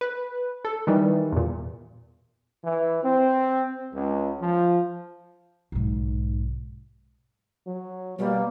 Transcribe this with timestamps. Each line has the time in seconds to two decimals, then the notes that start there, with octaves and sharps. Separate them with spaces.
0.01 B4
0.65 A4
0.87 D#3 E3 G3
1.32 E2 A#2
2.64 E3
3.04 C4
3.94 C#2
4.41 F3
5.72 B1 G#2
7.67 F#3
8.19 B2 G3 A#3